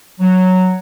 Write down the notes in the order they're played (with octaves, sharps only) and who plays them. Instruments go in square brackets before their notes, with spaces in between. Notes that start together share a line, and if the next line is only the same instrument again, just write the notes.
[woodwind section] F#3